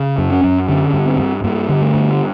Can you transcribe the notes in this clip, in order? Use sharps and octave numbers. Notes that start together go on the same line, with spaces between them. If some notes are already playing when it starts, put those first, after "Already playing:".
Already playing: C#3
F#2
C#4
F#2
D3 C#4
G2
C4
G2
G2 A#3
D3
A3
G2